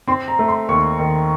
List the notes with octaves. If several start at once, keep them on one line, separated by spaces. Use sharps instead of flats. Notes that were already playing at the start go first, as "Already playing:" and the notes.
C4 C6
A#5
A3
C6
D#2 C#6
D#3